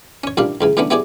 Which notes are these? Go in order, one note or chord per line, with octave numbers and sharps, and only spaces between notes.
C#4 C#5
A1 A#2 G3 D4 F5
C#2 C#3 E3
A2 E3 A3 B3 C#4 D4
B3 E4 G4 G#4 C#5 D5